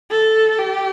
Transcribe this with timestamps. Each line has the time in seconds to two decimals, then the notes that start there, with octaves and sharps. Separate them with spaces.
0.11 A4
0.59 G4